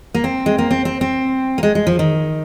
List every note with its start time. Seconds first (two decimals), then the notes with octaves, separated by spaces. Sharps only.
0.14 A#3
0.24 C4
0.46 G#3
0.58 A#3
0.71 C4
0.85 C4
1.01 C4
1.58 A#3
1.63 G#3
1.75 G#3
1.87 F3
1.99 D#3